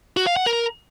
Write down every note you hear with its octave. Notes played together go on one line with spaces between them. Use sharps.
F#4
F5
F#5
A#4